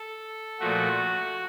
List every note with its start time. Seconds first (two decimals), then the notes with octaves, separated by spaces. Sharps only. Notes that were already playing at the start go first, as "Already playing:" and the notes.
Already playing: A4
0.60 A#2 F3 A3 F#4